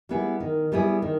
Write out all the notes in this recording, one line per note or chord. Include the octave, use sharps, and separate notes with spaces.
G3 B3 E4 G#4
D#3
G3 B3 E4 G#4
D#3